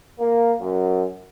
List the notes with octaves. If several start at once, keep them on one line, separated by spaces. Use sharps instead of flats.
A#3
F#2